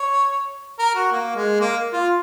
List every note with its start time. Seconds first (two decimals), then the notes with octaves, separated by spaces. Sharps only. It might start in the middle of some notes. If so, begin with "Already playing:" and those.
Already playing: C#5
0.79 A#4
0.95 F#4
1.12 A#3
1.36 G#3
1.61 A#3
1.93 F4